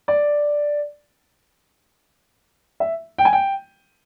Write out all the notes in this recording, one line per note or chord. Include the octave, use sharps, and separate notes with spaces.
D5
E5
G5
G#5
G5